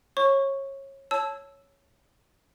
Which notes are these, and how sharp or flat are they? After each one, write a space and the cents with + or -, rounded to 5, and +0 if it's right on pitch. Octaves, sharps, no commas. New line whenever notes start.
C#5 -25 C#6 +0
C#5 +0 A5 -10 E6 +0